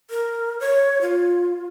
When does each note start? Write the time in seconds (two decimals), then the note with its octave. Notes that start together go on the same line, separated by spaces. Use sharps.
0.10 A#4
0.60 C#5
1.01 F4